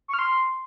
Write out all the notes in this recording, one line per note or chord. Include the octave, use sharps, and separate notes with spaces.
C#6
F6
C6